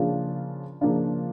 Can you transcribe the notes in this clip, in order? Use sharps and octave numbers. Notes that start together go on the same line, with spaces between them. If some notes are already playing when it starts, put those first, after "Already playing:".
Already playing: C#3 F3 A#3 D4 F4
C#3 F3 A#3 D4 F4